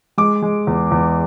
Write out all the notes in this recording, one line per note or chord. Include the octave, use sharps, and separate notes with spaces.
G#3 D6
G#3
E2
E2